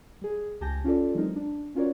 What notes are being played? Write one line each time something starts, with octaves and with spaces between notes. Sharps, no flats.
G3 G#4
C#2 G4 G#5 A5 G6 A#6
C#4 F4 G4 A4 D5
E3 F#3 G#3 C4 D#4 A#4
D4
C#4 F4 F#4 A#4 C#5 D5